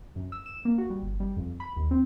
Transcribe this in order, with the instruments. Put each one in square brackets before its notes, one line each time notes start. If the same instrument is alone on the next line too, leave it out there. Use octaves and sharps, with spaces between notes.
[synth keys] F#2
E6
E7
A#3
F#4
G3
G1
G3
F2
B5
D#2
C4